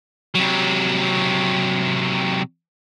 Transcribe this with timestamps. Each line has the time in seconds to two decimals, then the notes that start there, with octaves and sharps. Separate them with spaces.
0.35 C3 F#3